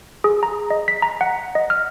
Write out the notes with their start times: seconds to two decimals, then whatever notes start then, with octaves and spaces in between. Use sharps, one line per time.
0.24 G#4
0.43 A#5
0.70 D#5
0.88 B6
1.02 A#5
1.21 F#5
1.55 D#5
1.70 F6